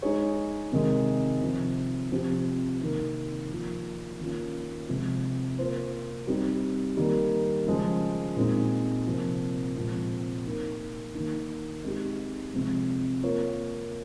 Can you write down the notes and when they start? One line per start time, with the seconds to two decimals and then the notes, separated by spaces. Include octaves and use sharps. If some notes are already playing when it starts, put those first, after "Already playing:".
0.02 G#3 D#4 G#4 C#5
0.72 C3 D#3 G#3
1.41 C3 F3 C4
2.10 C3 F3 C4 G4
2.81 C3 D#3 A#3 D#4 A#4
3.50 F3 A#3 F4
4.19 D#3 A#3 C#4 F4
4.89 C3 F3 G#3
5.59 A#3 F4 C5
6.27 G3 C4 D#4 G4
6.97 D#3 G3 A#3
7.67 C#3 F3 G#3
8.36 A#2 G#3 C4 D#4
9.06 C3 F3 A#3
9.76 A#2 F3 G#3 C4
10.45 A#3 D#4 A#4
11.15 D#3 A#3 D#4
11.85 G#3 C4 D#4 G4
12.54 C3 F3 G#3
13.23 A#3 F4 A#4 C#5